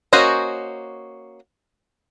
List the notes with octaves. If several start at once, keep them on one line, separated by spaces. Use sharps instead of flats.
A#3 C#4 F#4 C5 D#5